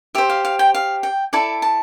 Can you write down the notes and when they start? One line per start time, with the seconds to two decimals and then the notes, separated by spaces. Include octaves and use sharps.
0.15 G4 C5 E5
0.30 F5
0.45 F5
0.59 G5
0.75 F5
1.03 G5
1.33 E4 A4 D5 A5
1.62 A5